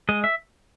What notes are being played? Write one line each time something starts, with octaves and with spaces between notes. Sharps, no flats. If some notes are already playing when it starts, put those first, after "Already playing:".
G#3 D#5
E5